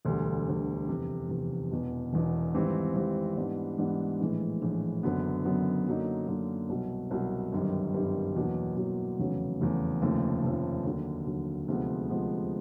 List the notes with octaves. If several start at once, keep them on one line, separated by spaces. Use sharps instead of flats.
E1 D2 D3 G3
E1 D2 D3 G3
F1 E2 C3
F1 E2 C3
E1 E2 B2
E1 E2 B2
G#1 G#2 E3 G3 C4
G#1 G#2 E3 G3 C4
G#2 E3 G3 B3 D4
G#2 E3 G3 B3 D4
A#1 A2 E3 G#3
A#1 A2 E3 G#3
F#1 F#2 D3 F#3 B3
F#1 F#2 D3 F#3 B3
F#2 D3 F#3 A#3 D#4
F#2 D3 F#3 A#3 D#4
C2 B2 F#3
C2 B2 F#3
G1 F#2 D#3 G3
G1 F#2 D#3 G3
E2 B2 F#3 A#3
E2 B2 F#3 A#3
F1 E2 C#3 F#3 A3
F1 E2 C#3 F#3 A3
F1 D#2 C#3 F3 A3
F1 D#2 C#3 F3 A3
D#2 D3 F#3
D#2 D3 F#3
D2 C3 F3 G#3 B3
D2 C3 F3 G#3 B3